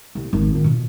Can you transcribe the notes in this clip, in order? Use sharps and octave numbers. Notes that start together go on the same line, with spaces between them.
C2
G#1
D#3 F4
B2